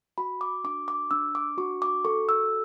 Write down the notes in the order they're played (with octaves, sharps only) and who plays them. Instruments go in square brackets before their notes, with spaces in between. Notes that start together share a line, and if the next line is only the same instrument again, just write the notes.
[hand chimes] F#4 B5
D6
D4 D6
D6
D4 E6
D6
F#4 C#6
D6
A4 C#6
E6